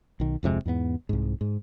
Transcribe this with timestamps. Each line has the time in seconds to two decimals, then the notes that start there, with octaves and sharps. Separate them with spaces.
0.20 B1 D#3
0.43 D1 F2 C3 G#3
0.65 E2 G#2 A#3 B3
1.09 C2 G#2
1.41 G#2